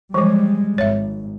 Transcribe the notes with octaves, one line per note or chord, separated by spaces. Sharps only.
E3 F3 G3 G#3
G#1 C#5 E5